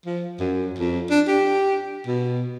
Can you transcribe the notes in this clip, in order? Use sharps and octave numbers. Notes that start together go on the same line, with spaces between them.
F3
F#2
F2
D4
G4
B2